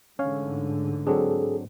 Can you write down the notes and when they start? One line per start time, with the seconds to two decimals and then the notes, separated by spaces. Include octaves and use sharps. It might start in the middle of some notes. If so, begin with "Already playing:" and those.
0.19 A1 G#2 D3 C#4 C#5 F5
1.07 F#3 C4 D4 G#4 A4